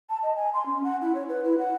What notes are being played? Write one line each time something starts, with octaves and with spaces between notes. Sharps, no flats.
A5
D#5
G#5
C6
C#4
F#5
E4
C#5
B4
E4
F#5